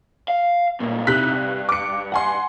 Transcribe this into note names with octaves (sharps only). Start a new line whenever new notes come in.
F5
B1 G2 A#2
C3 D#4 E4 F#6 B6
G2
D6 C#7
F#5 G#5 C6